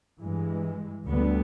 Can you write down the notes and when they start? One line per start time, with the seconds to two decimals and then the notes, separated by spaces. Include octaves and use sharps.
0.20 G2 E3 G#3
1.07 D2 D3 G3 B3